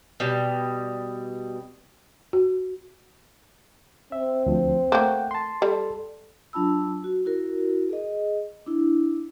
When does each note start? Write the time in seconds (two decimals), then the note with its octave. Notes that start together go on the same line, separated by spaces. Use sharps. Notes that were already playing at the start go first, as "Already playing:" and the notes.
0.20 B2 G3
2.33 F#4
4.12 C4 E5
4.46 D2 F3
4.92 A3 A#3 F#5 G5
5.31 A5 C6
5.62 G3 A4
6.53 F#3 D4 F4 A5 B5 E6
7.04 F#4
7.25 E4 F#4 A#4
7.90 G#4 D#5
8.66 D4 E4